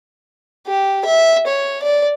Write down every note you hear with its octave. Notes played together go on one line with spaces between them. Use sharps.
G4
E5
C#5
D5